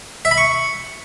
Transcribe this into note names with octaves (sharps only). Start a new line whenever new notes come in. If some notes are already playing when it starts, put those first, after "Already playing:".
E5
B5
C#6